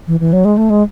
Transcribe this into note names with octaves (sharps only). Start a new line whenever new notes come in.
E3
E3
F#3
G#3
A3
G#3